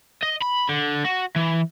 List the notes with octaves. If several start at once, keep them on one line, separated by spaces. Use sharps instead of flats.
D#5
B5
D3
F#4
E3